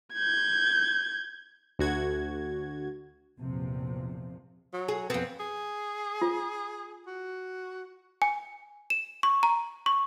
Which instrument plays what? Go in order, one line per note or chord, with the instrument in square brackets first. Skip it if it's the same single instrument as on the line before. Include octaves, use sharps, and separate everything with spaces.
[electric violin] G6 G#6
[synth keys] D2 F#4 G#6
[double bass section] A#1 E2 C3 F3
[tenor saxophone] F#3
[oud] G#4
[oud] F2 C4 [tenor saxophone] B3
[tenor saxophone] G#4
[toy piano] F4
[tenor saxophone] F#4
[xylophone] G#5
E7
C#6
A#5
C#6